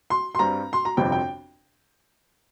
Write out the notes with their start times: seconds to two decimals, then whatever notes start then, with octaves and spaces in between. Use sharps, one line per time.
0.10 C6
0.35 C6
0.39 G2 G3 C4 A#5
0.73 C6
0.85 A#5
0.97 G1 F2 C3 F3 C4 G5
1.12 G5